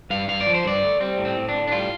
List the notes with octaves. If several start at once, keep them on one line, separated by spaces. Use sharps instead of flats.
G2 F5
G2 F5
D5
F3
C5
G2 D5
A3
G3 C4
A2
C4
A2
D4
A2
D4
G3 F4